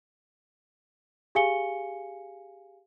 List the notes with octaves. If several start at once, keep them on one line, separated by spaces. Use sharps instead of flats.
G4 G#4 F5 G#5 C#7 G7